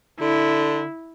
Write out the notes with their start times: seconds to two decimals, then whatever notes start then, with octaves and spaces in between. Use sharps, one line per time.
0.21 D3 E4